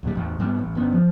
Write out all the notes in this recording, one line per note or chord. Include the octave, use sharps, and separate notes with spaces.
D#2 A#2 G3
A1 E2
G#2 G3 G#3 B3
A1
G1 B3 C#4
F3